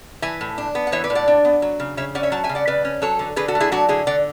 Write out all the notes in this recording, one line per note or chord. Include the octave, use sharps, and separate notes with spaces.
E3 E5 G#5
A2
D4
B3
F#5
E3 C#5 E5
B4 D5
A2
D5 F#5
D4
B3
F#3
C#3
C#3 C#5 E5
C#4 D5 F#5
C#5 E5
F#3 F#5 A5
E5 G#5
C#3
D5 F#5
C#3 B4 D5
C#4
F#3 A4 C#5
D3
D3 G#4 B4
F#4 A4
A3
E4 G#4
F#3 D4 F#4
D3 E4 G#4
D3 D5 F#5